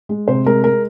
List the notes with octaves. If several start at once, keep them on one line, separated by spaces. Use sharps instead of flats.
G#3
C3 C5
G#3 A#4
G#3 A#4